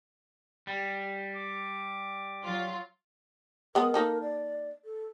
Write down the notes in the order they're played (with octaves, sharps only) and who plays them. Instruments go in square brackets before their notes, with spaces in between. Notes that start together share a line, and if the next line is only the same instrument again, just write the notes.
[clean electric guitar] G3
[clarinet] D6
[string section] F#3 F4
[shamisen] G#3 B3 [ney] A#4
[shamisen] A#3 D#4 A4
[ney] D5
A4